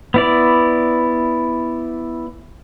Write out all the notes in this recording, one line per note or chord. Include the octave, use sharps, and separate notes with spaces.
B3 E4 D5